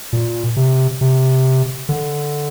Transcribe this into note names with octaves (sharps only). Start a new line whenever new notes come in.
A#2
C3
C3
D3